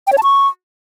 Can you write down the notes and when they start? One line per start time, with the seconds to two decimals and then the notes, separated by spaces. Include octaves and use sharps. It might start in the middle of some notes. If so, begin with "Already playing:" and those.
0.07 G5
0.12 C#5
0.18 A5
0.23 C#6